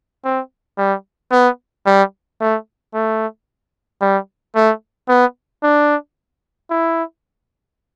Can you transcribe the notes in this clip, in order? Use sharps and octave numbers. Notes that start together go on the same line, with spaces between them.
C4
G3
B3
G3
A3
A3
G3
A3
B3
D4
E4